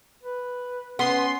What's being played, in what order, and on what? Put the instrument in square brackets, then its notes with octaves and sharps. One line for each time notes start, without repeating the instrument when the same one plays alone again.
[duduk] B4
[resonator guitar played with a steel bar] B3 [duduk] C#4 [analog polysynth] C6